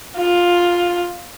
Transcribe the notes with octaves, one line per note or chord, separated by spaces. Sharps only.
F4